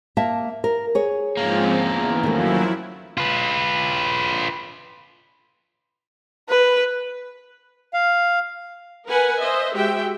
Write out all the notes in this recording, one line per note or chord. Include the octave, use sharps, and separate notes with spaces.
A#3 E5 A5
A#4
G#4 C#5
G#2 F3 A#3 C4 C#4
E2
D#3 F3 F#3 A3 E4
F4 B4
B4
F5
A#4 B4 F#5 G#5
C5 D#5 E5
G#3 F#4 G4 E5 G5